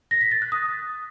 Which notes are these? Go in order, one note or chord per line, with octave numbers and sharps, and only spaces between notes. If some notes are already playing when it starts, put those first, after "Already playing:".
A#6
B6
A6
F#6
D#6